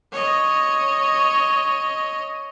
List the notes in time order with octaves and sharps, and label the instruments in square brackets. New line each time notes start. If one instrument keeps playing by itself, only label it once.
[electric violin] C#5 D#5